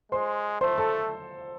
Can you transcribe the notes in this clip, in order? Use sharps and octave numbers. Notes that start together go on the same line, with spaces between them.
G#3 C5 C6
A3 C5 C6
A4 A5